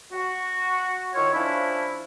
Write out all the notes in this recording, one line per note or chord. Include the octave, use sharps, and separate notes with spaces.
F#4
D#3 E4 F4 C#5
F3 C#4 D4 E4